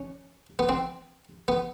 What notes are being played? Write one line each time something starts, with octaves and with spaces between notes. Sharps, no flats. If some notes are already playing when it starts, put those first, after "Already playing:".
Already playing: C#4
B3
C4
B3